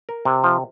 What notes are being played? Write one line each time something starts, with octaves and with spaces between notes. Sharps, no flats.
A#4
C3
F3